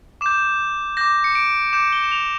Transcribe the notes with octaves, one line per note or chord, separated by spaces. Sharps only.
D6 G6 E7
D6 G6 A#6
C#7
D7
D6 G6 E7
G7
E7
F7